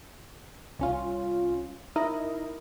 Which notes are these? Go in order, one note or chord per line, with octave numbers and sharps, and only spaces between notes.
C2 C#4 F4
D#4 E4 A#4 D#5